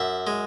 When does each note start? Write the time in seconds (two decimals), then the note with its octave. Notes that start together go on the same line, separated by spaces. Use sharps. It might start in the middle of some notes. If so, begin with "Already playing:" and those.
Already playing: F#2 E5
0.27 G#3